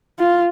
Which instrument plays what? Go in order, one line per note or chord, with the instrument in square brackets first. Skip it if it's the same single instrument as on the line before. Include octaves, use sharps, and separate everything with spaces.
[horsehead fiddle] F4